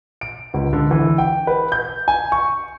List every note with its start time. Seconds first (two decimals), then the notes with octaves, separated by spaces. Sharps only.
0.21 D7
0.54 C#2
0.73 D3
0.91 E3
1.18 G5
1.47 B4
1.72 G6
2.08 G#5
2.32 C#6